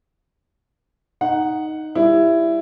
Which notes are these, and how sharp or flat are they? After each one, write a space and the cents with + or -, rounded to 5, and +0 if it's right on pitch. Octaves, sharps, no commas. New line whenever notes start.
D#4 +0 F#5 +0
G3 +20 E4 +15